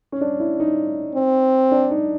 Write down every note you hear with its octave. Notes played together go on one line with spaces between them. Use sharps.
C#4
D4
E4
D#4
C4
D4
D#4